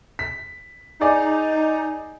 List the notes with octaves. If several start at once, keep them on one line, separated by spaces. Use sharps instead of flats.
B6
D#4 G#4 D5 D#5